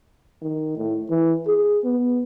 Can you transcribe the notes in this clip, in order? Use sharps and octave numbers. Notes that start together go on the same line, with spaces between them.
D#3
A2
E3
G#4
B3